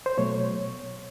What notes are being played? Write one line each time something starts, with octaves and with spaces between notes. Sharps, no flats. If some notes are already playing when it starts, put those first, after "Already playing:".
C5
B2 F#3 A3 C#5